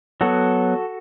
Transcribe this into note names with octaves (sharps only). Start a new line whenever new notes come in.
F#3 B3 F#4 A4